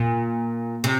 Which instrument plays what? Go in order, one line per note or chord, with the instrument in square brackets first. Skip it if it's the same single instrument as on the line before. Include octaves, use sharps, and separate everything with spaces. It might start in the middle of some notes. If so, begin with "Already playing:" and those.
Already playing: [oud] A#2
C3